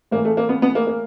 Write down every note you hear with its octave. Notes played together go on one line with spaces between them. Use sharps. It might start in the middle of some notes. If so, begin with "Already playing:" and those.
A2 E3 A#3
A3
A#3
B3
B3
A#3
A#3